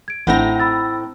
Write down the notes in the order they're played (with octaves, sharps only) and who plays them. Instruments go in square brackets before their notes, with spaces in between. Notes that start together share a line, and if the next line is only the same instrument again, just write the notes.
[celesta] G#6 D7
[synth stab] A1 A3 A#6 [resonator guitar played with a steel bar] A2 C4 D#4 [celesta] F#5
[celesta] B5 E6 A6